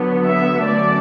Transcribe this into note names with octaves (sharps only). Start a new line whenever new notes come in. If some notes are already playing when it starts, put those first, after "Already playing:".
Already playing: D3 F#3 B3
E5
D3 F#3 A3 C#4 D5